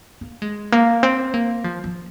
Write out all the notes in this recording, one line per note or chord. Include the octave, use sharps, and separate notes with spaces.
A#3
G#3
A#3
C4
A#3
F3
F3